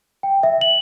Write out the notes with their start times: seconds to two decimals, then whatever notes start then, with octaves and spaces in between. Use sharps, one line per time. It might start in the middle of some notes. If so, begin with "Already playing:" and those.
0.23 G5
0.43 E5
0.61 F#7